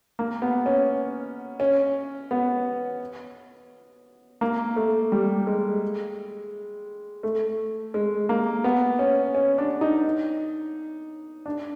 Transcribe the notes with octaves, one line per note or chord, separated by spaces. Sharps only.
A#3
B3
C#4
C#4
B3
A#3
A3
G3
G#3
A3
G#3
A#3
B3
C#4
C#4
D4
D#4
D4